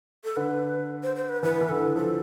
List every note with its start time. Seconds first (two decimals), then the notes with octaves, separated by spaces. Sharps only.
0.24 A4
0.36 D3 B4
1.03 C5
1.16 C5
1.29 B4
1.43 E3 B4
1.61 E3
1.69 D3 A4
1.78 E3
1.96 F3 A4